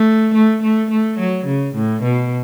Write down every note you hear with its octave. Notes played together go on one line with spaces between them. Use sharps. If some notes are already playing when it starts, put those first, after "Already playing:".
Already playing: A3
A3
A3
A3
F#3
C#3
A2
B2